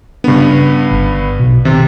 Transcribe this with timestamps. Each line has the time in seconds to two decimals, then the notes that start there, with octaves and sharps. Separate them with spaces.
0.24 G2 C#3 B3 D4
0.91 G1
1.40 B1 B2
1.65 C3 D#3